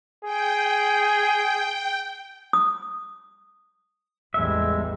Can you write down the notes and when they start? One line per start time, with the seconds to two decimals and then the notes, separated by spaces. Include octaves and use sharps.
0.24 G#4 G5
2.53 D#6
4.34 A1 E2 G3 G#3 E5